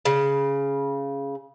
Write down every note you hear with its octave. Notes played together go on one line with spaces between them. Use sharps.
C#3